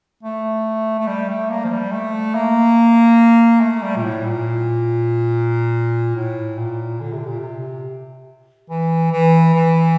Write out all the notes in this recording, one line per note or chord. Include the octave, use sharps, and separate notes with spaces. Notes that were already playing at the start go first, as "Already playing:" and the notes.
A3
A3
G3
A3
A#3
F3
G3
A3
A#3
A3
G3
A#2
A2
A#2
A2
A#2
D3
C3
A#2
C3
E3
E3
E3